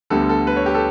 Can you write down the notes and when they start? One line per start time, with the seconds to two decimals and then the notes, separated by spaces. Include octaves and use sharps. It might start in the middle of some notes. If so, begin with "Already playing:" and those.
0.10 D2 D3 G3 B3 A4
0.29 A4
0.47 B4
0.57 C#5
0.66 G4
0.75 A4